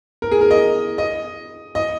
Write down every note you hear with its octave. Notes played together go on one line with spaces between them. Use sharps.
A#4
G#4
A#4
D#5
D#5
D#5